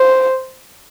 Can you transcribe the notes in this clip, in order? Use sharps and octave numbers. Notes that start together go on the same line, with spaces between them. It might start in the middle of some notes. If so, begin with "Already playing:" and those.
Already playing: C5